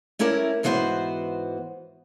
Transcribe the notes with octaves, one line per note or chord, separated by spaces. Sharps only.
A3 C#4 E4 A#4 D5
G#2 E3 B3 E4 F#4 C5